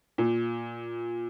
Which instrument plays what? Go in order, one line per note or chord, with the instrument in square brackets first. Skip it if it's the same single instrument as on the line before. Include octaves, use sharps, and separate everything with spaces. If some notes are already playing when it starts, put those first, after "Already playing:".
[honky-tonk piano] A#2